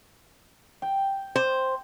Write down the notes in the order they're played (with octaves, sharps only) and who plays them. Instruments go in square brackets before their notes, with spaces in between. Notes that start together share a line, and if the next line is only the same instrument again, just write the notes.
[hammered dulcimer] G5
[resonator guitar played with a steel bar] C5